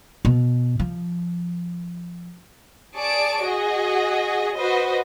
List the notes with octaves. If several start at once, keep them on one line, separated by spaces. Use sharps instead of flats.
B2
F3
G#4 D5 A5 C#6 D7
F#4 G#4 D#5
F#4 B4 C5 D#5